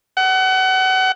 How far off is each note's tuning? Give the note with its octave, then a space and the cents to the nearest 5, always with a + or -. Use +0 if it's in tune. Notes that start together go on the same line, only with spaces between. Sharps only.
F#5 +30